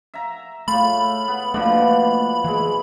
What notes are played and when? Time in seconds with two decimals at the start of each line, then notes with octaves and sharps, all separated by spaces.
0.14 E5 A#5
0.68 A2 A3 F4 B5
1.28 B3
1.54 B2 F3 A3 A#3 D4
2.44 E3 G#3 E4